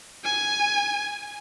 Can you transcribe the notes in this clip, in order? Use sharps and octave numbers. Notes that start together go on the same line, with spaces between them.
G#5